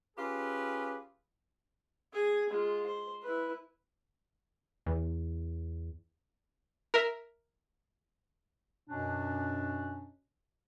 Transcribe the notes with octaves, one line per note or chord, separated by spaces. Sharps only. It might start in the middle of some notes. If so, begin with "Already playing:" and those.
C#4 F4 G4 G#4 B4
G#4 G#5
G#3 F4
C5
E4 B4
E2
A#4 E5
F#2 B2 C#4 D4